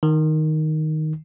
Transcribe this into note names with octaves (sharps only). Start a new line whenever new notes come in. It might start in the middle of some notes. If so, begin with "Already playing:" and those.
D#3